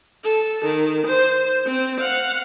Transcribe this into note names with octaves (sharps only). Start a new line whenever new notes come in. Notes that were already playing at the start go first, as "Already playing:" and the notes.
A4
D#3
C5
C4
F5 F#5